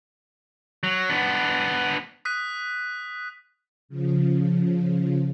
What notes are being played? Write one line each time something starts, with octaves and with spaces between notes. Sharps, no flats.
F#3
B3 D4
D#6 F#6 B6 D#7
C#3 F3